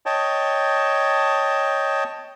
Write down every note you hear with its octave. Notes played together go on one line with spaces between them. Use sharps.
C#5 D#5 G5 A5